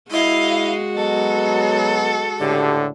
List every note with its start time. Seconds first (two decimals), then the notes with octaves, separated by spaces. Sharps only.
0.11 G#3 E4 F#4 D#5 F5
0.95 F#3 B3 A4 D#5
2.39 C#2 A2 D3 G4